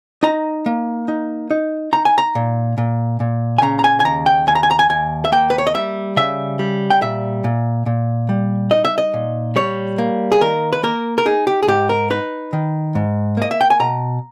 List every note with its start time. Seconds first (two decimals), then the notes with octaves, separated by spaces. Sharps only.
0.23 D#4 A#5
0.66 A#3
1.08 D#4
1.51 D#4
1.93 D#4 A#5
2.05 G#5
2.18 A#5
2.35 A#2
2.78 A#2
3.20 A#2
3.58 G#5
3.62 C#3 A#5
3.79 A#5
3.84 G#5
4.00 G#5
4.05 D#2 A#5
4.26 G5
4.47 D#2 G#5
4.55 A#5
4.63 G#5
4.71 A#5
4.79 G#5
4.89 D#2 G#5
5.25 E5
5.32 A#3 G5
5.50 B4
5.58 C#5
5.67 D#5
5.74 G3 E5
6.17 C#3 E5
6.59 G3
6.90 G5
7.02 A#2 E5
7.44 A#2
7.86 A#2
8.29 G3
8.71 D#4 D#5
8.85 E5
8.98 D#5
9.14 A#2
9.56 G3 C#5
9.98 A#3
10.32 G#4
10.41 D#3 A#4
10.73 B4
10.83 A#3 A#4
11.18 A#4
11.26 D#4 G#4
11.47 G4
11.63 G#4
11.68 G#2 G4
11.89 A#4
12.10 D#4 B4
12.53 D#3
12.95 G#2
13.37 A#3 D#5
13.51 E5
13.61 G5
13.70 G#5
13.80 B2 A#5